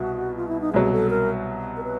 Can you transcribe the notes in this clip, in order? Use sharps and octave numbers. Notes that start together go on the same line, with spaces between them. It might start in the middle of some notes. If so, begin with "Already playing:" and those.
Already playing: C2 B2 F#4
F4
E4
D#4
C2 B2 F#3 G#4
A4
A#4
A#4
B4